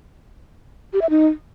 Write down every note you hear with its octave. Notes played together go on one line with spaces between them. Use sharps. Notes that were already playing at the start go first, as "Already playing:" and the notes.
G4
E5
D#4